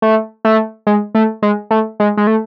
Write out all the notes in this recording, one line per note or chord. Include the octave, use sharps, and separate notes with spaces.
A3
A3
G#3
A3
G#3
A3
G#3
G#3
A3